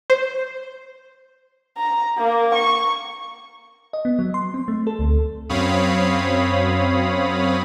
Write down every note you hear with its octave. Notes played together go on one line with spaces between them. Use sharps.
C5
A#5
A#3
C#6
D#5
B3
F#3
C6
C4
A3
A4
D2
F#2 C4 C#5 F5 B5 D#6